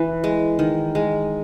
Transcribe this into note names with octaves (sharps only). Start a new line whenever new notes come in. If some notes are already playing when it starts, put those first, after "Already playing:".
Already playing: E3
G#3
D#3
G#3